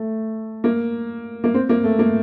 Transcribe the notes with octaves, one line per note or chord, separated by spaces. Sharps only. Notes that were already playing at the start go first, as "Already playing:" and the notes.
Already playing: A3
A#3
A#3
C4
A#3
A3
A#3